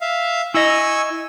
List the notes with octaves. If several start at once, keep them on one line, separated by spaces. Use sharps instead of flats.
E5 F5
E4 D#5 G#5 C#6 E6